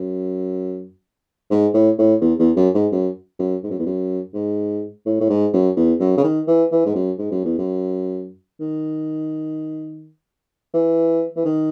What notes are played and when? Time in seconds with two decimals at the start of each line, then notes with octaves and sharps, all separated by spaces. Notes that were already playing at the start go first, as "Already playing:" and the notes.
Already playing: F#2
1.51 G#2
1.74 A2
1.98 A2
2.21 E2
2.39 E2
2.57 F#2
2.75 G#2
2.92 F#2
3.39 F#2
3.63 G#2
3.71 F#2
3.79 E2
3.86 F#2
4.34 G#2
5.06 A2
5.21 A2
5.30 G#2
5.54 F#2
5.77 E2
6.00 F#2
6.18 C#3
6.24 D#3
6.47 E3
6.72 E3
6.86 G#2
6.95 F#2
7.18 G#2
7.32 F#2
7.45 E2
7.58 F#2
8.60 D#3
10.74 E3
11.36 E3
11.45 D#3